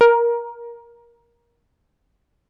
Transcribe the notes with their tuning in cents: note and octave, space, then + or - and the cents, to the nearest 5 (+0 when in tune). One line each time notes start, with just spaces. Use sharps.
A#4 +15